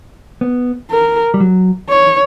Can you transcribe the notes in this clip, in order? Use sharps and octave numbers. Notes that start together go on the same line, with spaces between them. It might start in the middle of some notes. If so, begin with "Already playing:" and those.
B3
A#4
G3
F#3
C#5